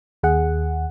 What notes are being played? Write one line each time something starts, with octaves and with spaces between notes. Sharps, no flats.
D#2 G#4 F#5